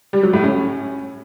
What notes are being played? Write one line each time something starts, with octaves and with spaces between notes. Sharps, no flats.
G3
F#3
A2
C#4